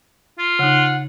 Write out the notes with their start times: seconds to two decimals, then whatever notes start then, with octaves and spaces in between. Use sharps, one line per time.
0.38 F4
0.59 C#3 D#4 F#5